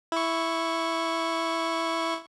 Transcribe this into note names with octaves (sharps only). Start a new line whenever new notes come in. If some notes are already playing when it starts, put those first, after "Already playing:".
E4 C#6